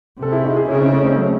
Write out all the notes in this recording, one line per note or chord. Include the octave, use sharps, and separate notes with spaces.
C3 A4
E4 G#4
D#4 F#4
E4 G#4
C#3 C#4 E4
C4 D#4
A3 C#4
C4 D#4
F#3 A3